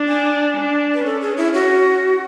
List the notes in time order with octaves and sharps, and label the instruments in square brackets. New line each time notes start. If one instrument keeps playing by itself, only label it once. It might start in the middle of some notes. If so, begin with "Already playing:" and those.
Already playing: [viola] D4
[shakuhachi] G#5
[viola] D4
[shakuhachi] B4
[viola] C#4 [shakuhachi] A4
[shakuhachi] G#4
E4
F#4